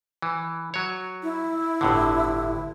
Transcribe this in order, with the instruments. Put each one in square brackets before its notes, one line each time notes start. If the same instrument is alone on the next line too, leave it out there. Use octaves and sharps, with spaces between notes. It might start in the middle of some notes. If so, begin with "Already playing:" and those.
[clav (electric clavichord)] E3
F#3 C#5
[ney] E4
[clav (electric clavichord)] G1 A2 D3